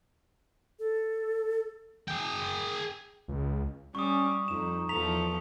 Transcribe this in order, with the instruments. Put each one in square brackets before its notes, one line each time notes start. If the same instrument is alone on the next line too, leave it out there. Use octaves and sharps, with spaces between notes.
[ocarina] A4
[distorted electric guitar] G#4 G5
[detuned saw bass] C#2
[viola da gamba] G3 [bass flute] C#4 [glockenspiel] C#6 D#6
[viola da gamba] F2 [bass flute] D#4 [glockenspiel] E7
[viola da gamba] E2 F3 A4 [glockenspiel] A#5 B6 F7